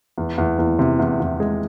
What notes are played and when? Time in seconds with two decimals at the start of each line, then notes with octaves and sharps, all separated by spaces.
0.18 E2
0.38 E2
0.59 E2
0.79 C3
0.99 E2
1.20 E2
1.40 G#3